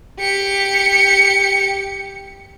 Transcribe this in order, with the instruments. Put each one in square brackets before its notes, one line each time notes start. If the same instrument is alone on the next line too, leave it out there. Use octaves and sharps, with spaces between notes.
[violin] G4 C#7